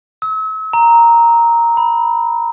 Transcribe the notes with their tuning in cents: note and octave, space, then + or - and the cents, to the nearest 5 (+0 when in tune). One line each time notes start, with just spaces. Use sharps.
E6 -40
A#5 +0
B5 -5